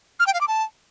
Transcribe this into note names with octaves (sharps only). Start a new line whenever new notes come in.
F6
G5
F5
D6
A5